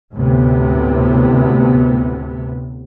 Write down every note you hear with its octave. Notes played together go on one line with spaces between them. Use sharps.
D2 A2 C3 B3